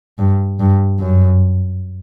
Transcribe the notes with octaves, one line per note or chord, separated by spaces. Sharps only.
G2
G2
F#2